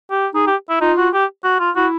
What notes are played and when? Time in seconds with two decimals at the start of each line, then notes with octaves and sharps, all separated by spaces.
0.11 G4
0.34 D#4 G#4
0.47 G4
0.69 E4
0.81 D#4 F4
0.98 F#4
1.14 G4
1.44 F#4
1.60 F4
1.76 E4 F#4